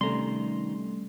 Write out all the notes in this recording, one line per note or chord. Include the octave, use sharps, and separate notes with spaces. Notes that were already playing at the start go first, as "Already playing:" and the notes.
C3 D#3 G3 A3 C#4 A#5 C6